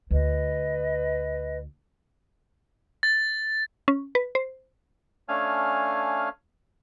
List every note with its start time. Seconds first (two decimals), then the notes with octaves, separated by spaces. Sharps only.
0.11 D2 B4 D#5
3.03 A6
3.88 C#4
4.15 B4
4.35 C5
5.29 A3 C#4 D4 F5 G#5 F6